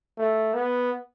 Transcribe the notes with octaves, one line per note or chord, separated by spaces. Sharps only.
A3
B3